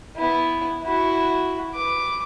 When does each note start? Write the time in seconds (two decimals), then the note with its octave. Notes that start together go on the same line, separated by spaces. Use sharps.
0.17 B3 E4
0.84 E4 F#4
1.74 B4 D6